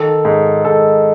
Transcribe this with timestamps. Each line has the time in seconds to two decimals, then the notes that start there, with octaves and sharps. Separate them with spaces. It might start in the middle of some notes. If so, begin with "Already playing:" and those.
Already playing: D#3 A4
0.25 G#2
0.65 G#2 A4